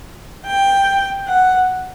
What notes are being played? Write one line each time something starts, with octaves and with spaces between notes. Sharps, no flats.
G5
F#5